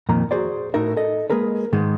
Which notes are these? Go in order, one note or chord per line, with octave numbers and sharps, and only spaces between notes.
F2 A#2 D#3 A#4 A#5
F#4 G#4 C5 D5
A2 D#4 F#4 A#4 E5
A4 D#5
G#3 A#3 G#4 A#4 B4
G#2 D#3 G#3